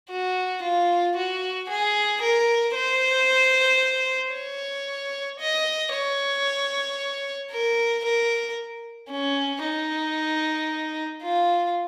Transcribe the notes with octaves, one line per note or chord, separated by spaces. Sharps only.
F#4
F4
F#4
G#4
A#4
C5
C#5
D#5
C#5
A#4
A#4
C#4
D#4
F4